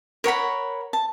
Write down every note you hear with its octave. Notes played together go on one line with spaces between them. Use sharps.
A#4 C#5 F#5 B5
A5